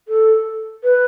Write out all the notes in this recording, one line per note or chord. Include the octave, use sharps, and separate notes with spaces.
A4
B4